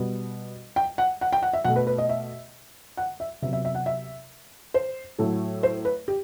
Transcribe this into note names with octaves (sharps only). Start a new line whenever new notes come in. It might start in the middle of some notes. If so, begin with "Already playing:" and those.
Already playing: B2 G3 B3
G5
F#5
F#5
G5
F#5
E5
B2 A3 F#5
B4
B4
D#5
E5
F#5
E5
C3 F#3 B3 E5
E5
E5
F#5
E5
C5
A2 F#3 A3
C5
B4
G4